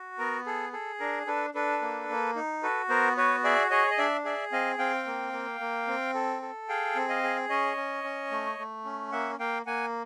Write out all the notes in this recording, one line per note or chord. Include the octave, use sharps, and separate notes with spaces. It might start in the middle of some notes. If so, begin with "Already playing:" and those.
Already playing: F#4
B3 A#4
G#4 A4
G#4 A4
D4 A#4
D4 A4 B4
D4 A4 B4
A#3
A#3
D#4
F#4 A4 B4
B3 A#4 C5
F#4 B4 C#5
G#4 D5 E5
G#4 C#5 D#5
D#5
D4 D5 E5
G#4 D5 E5
C4 D#5 F5
C4 F5 G5
A#3
A#3
A#3
C4
A4
A4
G#4 F5 G5
C4
D#5 F5
G#4
C#4 C#5 D#5
C#4
C#4
A3
A3
C#4
A#3 E5 F#5
A#3 F5 G5
A#3 F#5 G#5